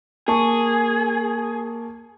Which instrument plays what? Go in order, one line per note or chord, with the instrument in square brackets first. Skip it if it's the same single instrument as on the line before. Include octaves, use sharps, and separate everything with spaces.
[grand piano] A#3 A5 C#6 [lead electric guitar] G#4